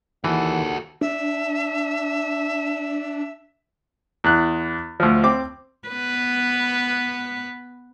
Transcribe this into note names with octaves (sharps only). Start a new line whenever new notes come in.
D#2 E3 F#4 A4 F#5
D4 E5
E2 F#6
D2 F3
C4 D6
B3 B4